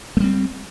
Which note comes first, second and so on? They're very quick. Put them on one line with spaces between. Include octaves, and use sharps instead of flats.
A3 G3 C4